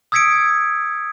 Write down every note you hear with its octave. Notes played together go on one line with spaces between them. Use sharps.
D#6 E6 G#6 B6 C#7 D7